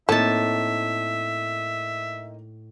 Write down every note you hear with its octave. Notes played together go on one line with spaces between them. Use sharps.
A2 A#3 C4 D#4 A4 E5 A5